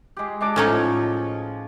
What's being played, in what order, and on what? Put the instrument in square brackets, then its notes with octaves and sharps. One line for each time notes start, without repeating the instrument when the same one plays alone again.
[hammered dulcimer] G#3 G4
G#3 D4 D6
[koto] A2 C#4 D#4 [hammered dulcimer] F3 C#5 C#6